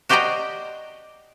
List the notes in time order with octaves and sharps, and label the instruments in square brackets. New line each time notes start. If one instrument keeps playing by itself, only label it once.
[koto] F#4 G4 C5 D5 D#5 A#5